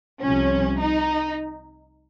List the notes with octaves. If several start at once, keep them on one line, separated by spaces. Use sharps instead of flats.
C2 C3 F3 C#4
D#4